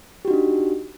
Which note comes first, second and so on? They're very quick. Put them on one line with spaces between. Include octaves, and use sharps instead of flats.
G4 F#4 D#4 D4